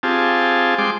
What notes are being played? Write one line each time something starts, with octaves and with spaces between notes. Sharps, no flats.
C4 F4 G4 G#4 A5
G#3 G5 C6 D6